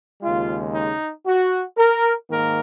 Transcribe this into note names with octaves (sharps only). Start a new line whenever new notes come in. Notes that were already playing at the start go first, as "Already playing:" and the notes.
D#2 C#3 G#3 F4
D#4
F#4
A#4
G#2 D#3 A#3 A#4